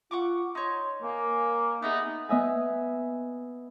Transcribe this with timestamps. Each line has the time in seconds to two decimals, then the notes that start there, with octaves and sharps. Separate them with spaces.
0.11 F4 F#5 C#6 D6
0.55 D#4 C#5 C6
1.03 A#3 G#5
1.82 B3 D#4 F#4 G#4 E5
2.29 B3 D#5 E5 G#5